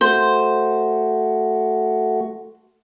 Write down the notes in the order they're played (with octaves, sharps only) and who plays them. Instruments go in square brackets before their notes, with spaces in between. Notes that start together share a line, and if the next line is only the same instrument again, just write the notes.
[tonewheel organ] A3 F#4 [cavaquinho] C5